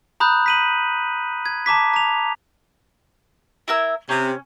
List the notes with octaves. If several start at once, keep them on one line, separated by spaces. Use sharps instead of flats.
A#5 B5 D#6 F#6 G6
B6 D#7 F#7
G#6
A5 A#5 D6 B6
A#5 F7
E4 A#4 E6
C3 C#4